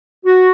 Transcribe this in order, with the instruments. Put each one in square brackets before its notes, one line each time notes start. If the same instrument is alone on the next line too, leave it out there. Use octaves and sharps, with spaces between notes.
[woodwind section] F#4